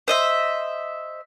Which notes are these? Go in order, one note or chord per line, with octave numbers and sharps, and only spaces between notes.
C5 D#5 E5